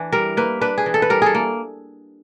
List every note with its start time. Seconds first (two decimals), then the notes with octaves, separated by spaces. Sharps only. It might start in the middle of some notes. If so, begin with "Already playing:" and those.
Already playing: E3 D4
0.12 G3 A#4
0.37 A#3 B4
0.61 D4 B4
0.78 G#4
0.86 E3
0.94 A4
1.02 B4
1.10 G3 A#4
1.22 G#4 A4
1.35 A#3